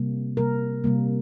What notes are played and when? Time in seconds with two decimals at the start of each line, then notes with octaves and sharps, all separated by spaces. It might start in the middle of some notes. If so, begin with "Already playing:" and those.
Already playing: C3 G3 A#3
0.37 C3 G3 A#3 A#4
0.84 C3 G3 A#3